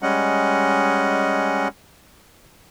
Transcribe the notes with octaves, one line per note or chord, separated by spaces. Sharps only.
G3 G#3 C#4 D#5 F#5